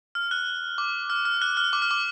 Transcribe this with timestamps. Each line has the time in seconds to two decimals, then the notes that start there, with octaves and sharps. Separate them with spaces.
0.15 F6
0.31 F#6
0.78 D6
1.10 F6
1.25 F6
1.42 F#6
1.57 F6
1.73 D6
1.82 F6
1.91 D6